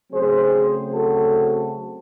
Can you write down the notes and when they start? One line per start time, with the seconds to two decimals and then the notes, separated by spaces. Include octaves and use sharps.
0.12 C#3 F#3 A3 C4 G#4 C5
0.92 F#4 A4